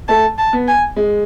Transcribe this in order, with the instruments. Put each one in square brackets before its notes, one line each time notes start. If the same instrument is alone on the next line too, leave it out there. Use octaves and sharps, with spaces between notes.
[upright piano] A3 [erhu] A5
[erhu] A5
[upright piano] B3
[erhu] G#5
[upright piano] G#3